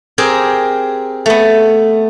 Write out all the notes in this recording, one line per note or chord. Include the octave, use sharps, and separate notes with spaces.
C4 G4 G#4 A#4 G5
A3 B3